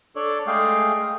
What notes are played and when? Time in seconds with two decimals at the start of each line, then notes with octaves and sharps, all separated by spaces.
0.16 D4 A4 C#5 D5
0.47 G#3 A3 G#4 F5 G5